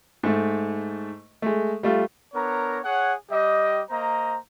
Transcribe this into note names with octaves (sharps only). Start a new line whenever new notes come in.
G#2 A3
G#3 A3
G3 A3 F4
B3 D4 A#4 C#5 A#5
G#4 C#5 F#5
G3 G4 D#5
A#3 C5 D#5 A#5